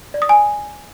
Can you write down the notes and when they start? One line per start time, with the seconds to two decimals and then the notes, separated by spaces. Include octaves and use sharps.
0.14 D5
0.22 D#6
0.29 G#5